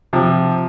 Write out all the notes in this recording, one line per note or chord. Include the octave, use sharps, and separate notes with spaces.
C3 F3